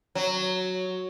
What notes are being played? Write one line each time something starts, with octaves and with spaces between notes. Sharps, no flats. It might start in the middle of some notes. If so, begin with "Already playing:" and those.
F#3